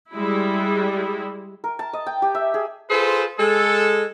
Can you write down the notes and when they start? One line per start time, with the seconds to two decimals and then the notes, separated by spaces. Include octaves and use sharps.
0.11 G3 G#3 E4
1.64 A#4
1.79 A5
1.93 D#5
2.06 G5
2.22 G4
2.35 E5
2.54 G#4
2.90 F4 G#4 A4 B4 C5
3.39 G#3 A4